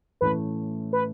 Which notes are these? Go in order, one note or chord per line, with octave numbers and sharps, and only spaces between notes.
A2 E3 A3 C#4 B4
B4